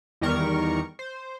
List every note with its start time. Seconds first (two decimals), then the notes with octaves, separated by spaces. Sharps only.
0.21 E2 D#3 G3 A#4 C#6
0.99 C5